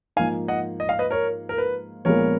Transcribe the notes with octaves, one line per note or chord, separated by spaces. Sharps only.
G#2 F3 A#3 D#4 F5 G#5
D#5 F#5
D#5
F5
B4 D#5
A#4 C#5
A#4
B4
A#1 A#2 F3 G#3 B3 A#4 C#5